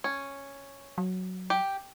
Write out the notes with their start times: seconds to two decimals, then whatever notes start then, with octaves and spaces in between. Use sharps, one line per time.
0.04 C#4
0.98 F#3
1.50 G4